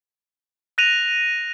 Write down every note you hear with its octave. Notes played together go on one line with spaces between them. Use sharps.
F#6 A#6 D#7 F7